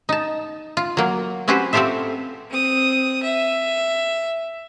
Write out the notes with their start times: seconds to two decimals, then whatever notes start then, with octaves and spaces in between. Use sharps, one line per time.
0.09 D#4 A5
0.77 F4
0.97 F#3 A#3
1.48 C4 C#4 F#4 G4 B4 C5
1.73 C4 F4 G4 A4 C5 E5
2.50 C4 D#6
3.23 E5